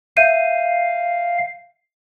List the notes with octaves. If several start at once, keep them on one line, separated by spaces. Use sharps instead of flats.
E5 F5 G6 D#7